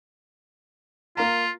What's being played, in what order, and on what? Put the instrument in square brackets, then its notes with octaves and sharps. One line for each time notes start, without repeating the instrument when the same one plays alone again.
[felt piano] A#3 F5 A#5 [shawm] F4